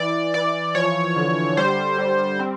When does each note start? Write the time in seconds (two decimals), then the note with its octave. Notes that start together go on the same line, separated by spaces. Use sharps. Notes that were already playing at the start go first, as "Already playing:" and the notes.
Already playing: E3 D5
0.34 E3 D5
0.75 F3 C#5
1.16 D3
1.57 G3 C5
1.98 G3
2.39 C4